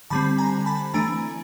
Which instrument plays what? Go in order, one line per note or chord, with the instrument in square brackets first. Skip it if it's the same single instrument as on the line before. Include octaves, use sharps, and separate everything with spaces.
[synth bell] D3 G3 C4 A5 B5
G#5 A#5
A5 B5
E3 A3 D4 G#5 A#5